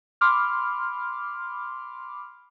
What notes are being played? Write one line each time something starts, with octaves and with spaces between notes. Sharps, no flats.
B5 C6 D6 F6